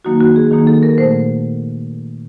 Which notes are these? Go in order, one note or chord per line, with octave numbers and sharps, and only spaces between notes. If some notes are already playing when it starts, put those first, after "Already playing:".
D#3 F#3 A#3 D#4 F#4
F#4
G#4
D#3 F#3 A#3 D#4
A4
A#4
A#2 F#3 A3 C5